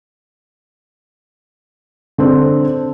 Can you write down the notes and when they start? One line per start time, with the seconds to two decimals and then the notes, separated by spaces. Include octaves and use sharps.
2.18 D3 C4